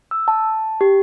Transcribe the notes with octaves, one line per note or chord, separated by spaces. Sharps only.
E6
A5
G4